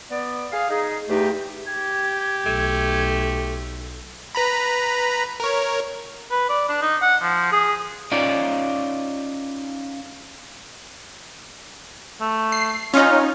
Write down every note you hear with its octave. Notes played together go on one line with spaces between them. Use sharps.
B3 D5
G#4 F5
D#4 G#4
E2 A3 D#4 G4
G4 G#6
B1 A3
B4 A#5 B5
A#4 C#5
B4
D5
D4
D#4
F#5
F3
G#4
C#4 D#4 F4 D5
A3
C7
C#4 D#4 F4